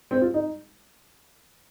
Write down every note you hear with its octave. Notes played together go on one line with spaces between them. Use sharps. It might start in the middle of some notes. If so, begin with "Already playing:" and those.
C4
F4
D#4